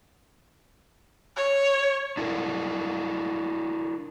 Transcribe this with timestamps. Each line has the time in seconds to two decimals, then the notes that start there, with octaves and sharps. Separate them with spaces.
1.36 C#5
2.17 D4 E4 A4 A#4